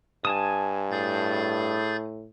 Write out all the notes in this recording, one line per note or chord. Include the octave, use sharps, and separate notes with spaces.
G2 G#5 A5 D#6
A2 G#4 G6 A6